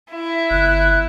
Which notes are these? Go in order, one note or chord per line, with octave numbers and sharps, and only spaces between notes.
E4
G1 F#6